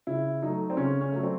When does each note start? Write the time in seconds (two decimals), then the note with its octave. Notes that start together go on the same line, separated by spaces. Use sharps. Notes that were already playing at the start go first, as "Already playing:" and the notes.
0.07 C#3 E4
0.42 F#3 A3 D#4
0.70 C4
0.77 C#3 C#4
1.01 C#4
1.12 F#3 A3
1.23 C4